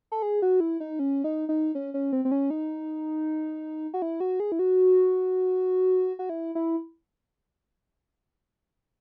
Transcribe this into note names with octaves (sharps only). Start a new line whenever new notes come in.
A4
G#4
F#4
E4
D#4
C#4
D#4
D#4
C#4
C#4
C4
C4
C#4
D#4
F#4
E4
F#4
G#4
E4
F#4
F#4
E4
E4